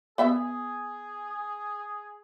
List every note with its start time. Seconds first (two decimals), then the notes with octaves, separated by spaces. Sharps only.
0.18 B3 G#4 E5